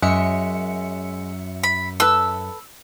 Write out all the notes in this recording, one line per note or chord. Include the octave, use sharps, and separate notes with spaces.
F#2 G#3 E5 C#7
B5
A4 B4 E6